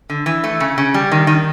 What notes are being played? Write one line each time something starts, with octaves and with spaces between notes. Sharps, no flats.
D3
E3
A3
C#3
C#3
G3
D#3
D#3